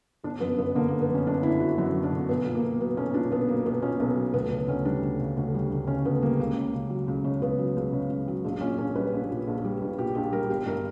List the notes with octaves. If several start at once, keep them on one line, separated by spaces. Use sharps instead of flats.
G1 D4
F#2 B3
G1 B3
D3 A#3
A#3
G1
B3
F#2 C#4
G1 D4
D3 E4
G1 F#4
F#2 F#4
G1
D4
D3
B1 B3
A#2
A#3
B1
F#3 B3
B1 C#4
A#2 D4
B1 B3
F#3 A#3
B1 B3
A#2 C#4
B1 B3
F#3
D2 B3
C#3 B3
D2 C#4
G3 D4
D2
C#3
D2
G3
D2
C#3 C#4
D2 B3
G3 A#3
C#2 A#3
C#3
C#2
F#3
C#2
C#3
C#2 B3
F#3
C#2
C#3
C#2
F#3
A#1
A#2 C#4
A#1 C#4
G3 B4
A#1
A#2
A#1
G3
A#1
A#2 G4
A#1 G4
G3 A#4
G1 G4
G2 A#4